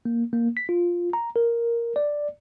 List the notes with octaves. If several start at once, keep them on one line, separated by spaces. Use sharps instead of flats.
A#3
A#3
B6
F4
A#5
A#4
D5